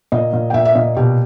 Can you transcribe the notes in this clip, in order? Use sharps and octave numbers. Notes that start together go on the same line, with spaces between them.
A#2 D#5
A#2
G5
A#2 E5
E5
A#2 D#5
B2 G4